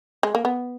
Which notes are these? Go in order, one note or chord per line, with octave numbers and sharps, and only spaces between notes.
G#3
A#3
B3